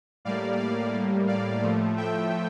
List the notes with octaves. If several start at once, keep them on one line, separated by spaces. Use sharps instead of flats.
A2 G3 A#3 D5 F5
D5 F5
A2 G3 A#3
D5 F5
A2 F3 A3
E5 G5